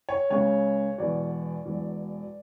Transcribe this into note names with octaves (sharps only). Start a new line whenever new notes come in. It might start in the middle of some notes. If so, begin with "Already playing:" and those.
C#5
C#2 C#3 G#3 C#5
E1 E2 B2 F#3 D5
E1 E2 B2 F#3